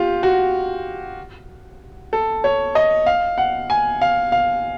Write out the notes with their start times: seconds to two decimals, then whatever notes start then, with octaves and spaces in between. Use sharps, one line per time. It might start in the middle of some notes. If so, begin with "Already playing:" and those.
Already playing: F4 G4
0.23 F#4
2.13 A4
2.44 C#5
2.75 D#5
3.06 F5
3.38 F#5
3.70 G#5
4.01 F5
4.32 F5